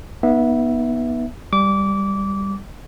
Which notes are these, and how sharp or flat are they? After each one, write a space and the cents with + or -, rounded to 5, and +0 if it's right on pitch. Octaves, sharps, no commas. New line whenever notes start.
B3 -25 D#4 +0 E5 +0
G3 +5 D6 -20